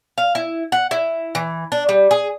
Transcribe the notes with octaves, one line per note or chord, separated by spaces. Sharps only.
F5
E4
F#5
E4
E3
D4
G3
G#4